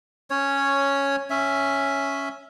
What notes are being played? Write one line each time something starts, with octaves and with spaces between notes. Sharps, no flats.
C#4 C#5
C#4 E5